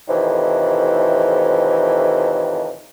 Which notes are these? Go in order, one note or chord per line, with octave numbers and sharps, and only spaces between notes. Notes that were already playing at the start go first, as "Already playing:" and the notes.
F2 A2 C3 D#3 E3